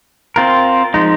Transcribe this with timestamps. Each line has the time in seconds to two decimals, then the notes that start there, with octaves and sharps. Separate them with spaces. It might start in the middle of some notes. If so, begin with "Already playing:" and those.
0.36 C4 F4 A#4
0.94 F3 G#3 D#4